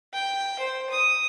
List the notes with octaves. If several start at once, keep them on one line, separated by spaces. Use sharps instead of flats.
G5
C5
D#6